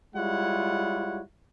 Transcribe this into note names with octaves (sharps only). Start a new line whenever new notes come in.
G3 G#3 E4 F4 C#5 F#5